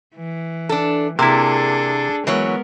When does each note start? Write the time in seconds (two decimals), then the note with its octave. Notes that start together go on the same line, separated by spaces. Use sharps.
0.16 E3
0.69 D4 A4
1.19 C3 A#3 D4 E4 G#4 A4
2.27 E3 F#3 G#3 B3 A#4 C#5